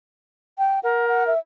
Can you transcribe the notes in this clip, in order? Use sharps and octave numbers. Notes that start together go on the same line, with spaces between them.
G5
A#4 F#5
F#5
E5